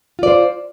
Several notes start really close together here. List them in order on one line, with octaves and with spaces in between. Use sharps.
F4 D5 C5